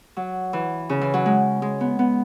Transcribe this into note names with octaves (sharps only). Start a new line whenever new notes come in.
F#3
E3
C#3
E3
F#3
G#3
G#3
B3
B3